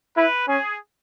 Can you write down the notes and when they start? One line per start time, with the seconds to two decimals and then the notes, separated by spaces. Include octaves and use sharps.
0.17 E4 B4
0.48 C#4 G#4